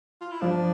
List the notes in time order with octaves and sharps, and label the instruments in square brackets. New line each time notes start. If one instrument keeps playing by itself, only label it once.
[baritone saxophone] F4
E4
[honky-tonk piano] F3 [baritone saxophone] D4